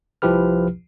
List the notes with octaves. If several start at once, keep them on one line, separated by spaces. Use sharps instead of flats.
C2 F3 E4 G4 B4 F6